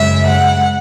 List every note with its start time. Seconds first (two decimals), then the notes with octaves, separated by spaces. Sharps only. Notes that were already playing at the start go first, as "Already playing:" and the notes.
Already playing: F#2 C#3 G#3 E5
0.25 F#5